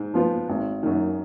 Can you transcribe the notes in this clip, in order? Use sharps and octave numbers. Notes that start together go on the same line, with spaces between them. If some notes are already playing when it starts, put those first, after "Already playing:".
Already playing: G#2
F3 B3 F4
G#1
F#2 D#3